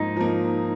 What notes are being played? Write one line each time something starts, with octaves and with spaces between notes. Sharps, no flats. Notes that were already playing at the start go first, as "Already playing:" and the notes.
Already playing: G#2 F3 A#3 D#4
F3 A#3